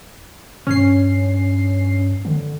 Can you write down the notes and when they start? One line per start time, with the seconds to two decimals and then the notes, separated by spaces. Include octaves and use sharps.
0.67 G2 C#4 C7
2.25 D3